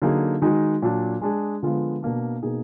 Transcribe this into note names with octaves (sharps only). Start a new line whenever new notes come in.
D3 F#3 A#3 D#4 G#4
D#3 G#3 D#4 F#4
A#2 F#3 D4
G#3 D4 G#4
D3 F3 G#3 B3 F4
B2 A#3 D4
B2 A#3 D#4 G#4